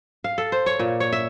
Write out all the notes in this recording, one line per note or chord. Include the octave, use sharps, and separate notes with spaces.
F5
A4
C5
C#5
A#2
C#5
E5